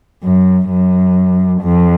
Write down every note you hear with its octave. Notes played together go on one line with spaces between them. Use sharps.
F#2
F#2
F2